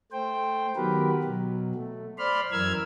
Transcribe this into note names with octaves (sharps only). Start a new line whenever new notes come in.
A3 C5 G5
D#3 F#3 B3 G4 A#4 B4
B2 F#3
A3
C5 D5 B5 C6 F6
F#2 E3 A#4 E6 F6 G#6